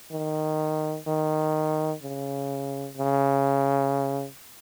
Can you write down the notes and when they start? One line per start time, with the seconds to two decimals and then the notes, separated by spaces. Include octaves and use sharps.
0.11 D#3
1.07 D#3
2.02 C#3
2.97 C#3